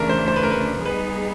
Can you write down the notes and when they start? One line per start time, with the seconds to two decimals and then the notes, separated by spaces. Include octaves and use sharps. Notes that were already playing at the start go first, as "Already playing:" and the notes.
Already playing: D2 C#3 E3 A3 D4 A#4
0.09 C5
0.28 C5
0.36 B4
0.43 A#4
0.51 B4
0.85 G3 B3 D#4 G#4 B4